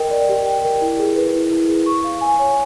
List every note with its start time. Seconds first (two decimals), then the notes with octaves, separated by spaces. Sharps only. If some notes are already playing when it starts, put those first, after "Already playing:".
Already playing: A#4 D#5 G5
0.11 D5
0.29 G4
0.46 G5
0.64 A#4
0.82 E4
0.99 G#4
1.16 B4
1.34 E4
1.51 E4
1.68 G#4
1.86 C#6
2.04 F5
2.21 G#5
2.39 C#5